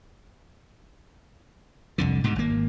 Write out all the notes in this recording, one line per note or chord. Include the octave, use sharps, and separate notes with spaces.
C2 F2 D3
G#2 B2 D3
G#1 A#3